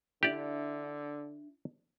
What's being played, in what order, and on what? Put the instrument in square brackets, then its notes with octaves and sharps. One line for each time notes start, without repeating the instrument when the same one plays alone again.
[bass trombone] D3 [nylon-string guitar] D4 E4 [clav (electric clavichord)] G4 D5